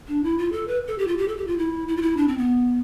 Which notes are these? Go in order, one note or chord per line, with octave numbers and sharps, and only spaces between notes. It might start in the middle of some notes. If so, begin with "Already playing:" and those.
D4
E4
F4
A4
B4
A4
G4
F4
G4
A4
G4
F4
E4
E4
F4
E4
D4
C4
B3